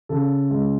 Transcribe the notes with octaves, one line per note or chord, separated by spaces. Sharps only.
C#3 A4
G#3